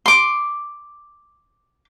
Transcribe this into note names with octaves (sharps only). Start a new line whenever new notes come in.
C6 D6